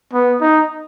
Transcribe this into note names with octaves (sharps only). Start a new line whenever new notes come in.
B3
D#4